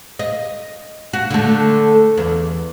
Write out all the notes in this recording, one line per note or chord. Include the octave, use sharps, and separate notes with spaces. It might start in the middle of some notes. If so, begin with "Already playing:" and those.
D#5
F#4
D3 A3
E2